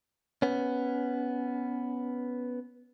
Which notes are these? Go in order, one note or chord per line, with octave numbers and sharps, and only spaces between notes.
B3 C#4